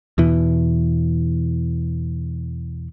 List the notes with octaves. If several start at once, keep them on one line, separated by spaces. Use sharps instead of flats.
E2 B2 E3